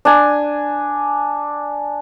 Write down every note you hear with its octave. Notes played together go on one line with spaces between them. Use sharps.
D4 G#5